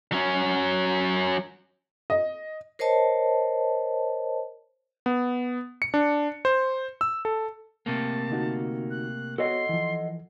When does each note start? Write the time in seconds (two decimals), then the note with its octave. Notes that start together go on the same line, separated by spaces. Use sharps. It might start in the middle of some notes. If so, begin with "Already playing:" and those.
0.12 F#3 C#4
2.10 D#5
2.79 A#4 C5 C#5 D#5 A5
5.06 B3
5.82 C#7
5.94 D4
6.45 C5
7.01 E6
7.25 A4
7.86 C3 A3 A#3 A5
8.30 D3 D#4 F#4
8.90 F#6
9.38 B3 F#4 A4 C#5 D#5 F#5 C6
9.69 E3 F3